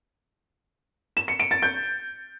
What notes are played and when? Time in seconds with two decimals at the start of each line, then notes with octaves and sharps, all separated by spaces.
1.17 E7
1.28 C#7
1.40 D7
1.51 A6
1.62 G6